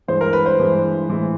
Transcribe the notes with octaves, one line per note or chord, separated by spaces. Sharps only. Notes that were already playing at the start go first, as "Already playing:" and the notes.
G2 E3 G#3 C5
A#4
B4
C5
G2 E3 G#3
A2 E3 G#3